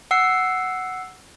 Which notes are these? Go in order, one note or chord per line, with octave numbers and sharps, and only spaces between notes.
F#5 E6 C7